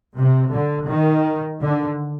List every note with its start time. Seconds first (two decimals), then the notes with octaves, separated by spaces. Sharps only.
0.16 C3
0.52 D3
0.88 D#3
1.60 D3